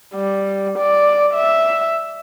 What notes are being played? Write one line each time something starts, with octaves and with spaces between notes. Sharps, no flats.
G3
D5
E5